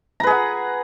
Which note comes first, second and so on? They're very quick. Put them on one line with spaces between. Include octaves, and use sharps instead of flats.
A#5 B4 G#4 F#5